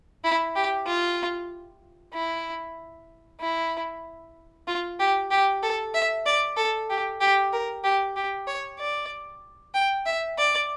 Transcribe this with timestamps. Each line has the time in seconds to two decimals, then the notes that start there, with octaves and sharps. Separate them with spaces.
0.24 E4
0.55 G4
0.87 F4
2.13 E4
3.40 E4
4.67 F4
4.99 G4
5.31 G4
5.63 A4
5.94 E5
6.26 D5
6.57 A4
6.89 G4
7.20 G4
7.53 A#4
7.84 G4
8.16 G4
8.47 C#5
8.79 D5
9.74 G5
10.06 E5
10.38 D5